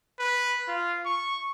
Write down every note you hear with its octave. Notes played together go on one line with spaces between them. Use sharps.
B4
F4
C#6